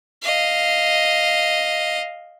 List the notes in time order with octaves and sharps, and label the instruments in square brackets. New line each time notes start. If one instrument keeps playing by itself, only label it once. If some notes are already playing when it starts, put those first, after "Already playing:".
[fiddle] D#5 F5